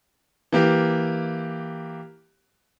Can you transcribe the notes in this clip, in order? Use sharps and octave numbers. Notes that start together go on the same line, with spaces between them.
E3 A#3 G4